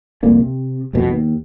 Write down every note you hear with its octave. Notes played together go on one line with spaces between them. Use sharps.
C2 F2 A#3 D4
C3
F1 C2 F2 B2
D#2